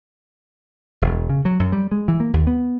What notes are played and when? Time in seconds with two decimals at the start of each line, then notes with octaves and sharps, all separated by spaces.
1.02 E1
1.30 C#3
1.45 F#3
1.60 F#2
1.72 G3
1.91 G#3
2.08 E3
2.20 A#3
2.33 D#2
2.47 B3